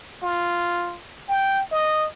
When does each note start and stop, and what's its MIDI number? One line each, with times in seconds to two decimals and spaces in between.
0.22 0.98 65
1.29 1.62 79
1.72 2.07 75